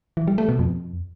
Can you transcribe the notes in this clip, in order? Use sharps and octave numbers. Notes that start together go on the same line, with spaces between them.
E3
G3
A3
B2
F2